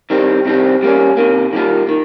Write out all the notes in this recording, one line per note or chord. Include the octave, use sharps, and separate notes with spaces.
D#3 G3 C4
C3 D#3 G3 C4
G3 A#3 C#4
C3 D#3 A#3
D#3 G3 A#3 F4
D#3